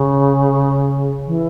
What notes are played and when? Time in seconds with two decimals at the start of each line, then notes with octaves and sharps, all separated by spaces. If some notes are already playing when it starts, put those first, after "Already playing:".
Already playing: C#3
1.27 E3